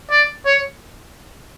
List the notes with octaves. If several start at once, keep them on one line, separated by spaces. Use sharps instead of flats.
D5
C#5